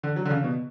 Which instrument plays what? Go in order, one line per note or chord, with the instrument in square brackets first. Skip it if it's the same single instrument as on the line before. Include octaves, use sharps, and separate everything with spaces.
[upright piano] D3
F#3
D3
C#3
B2